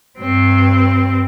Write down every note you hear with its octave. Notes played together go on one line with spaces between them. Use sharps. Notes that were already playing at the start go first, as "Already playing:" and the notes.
G2 C4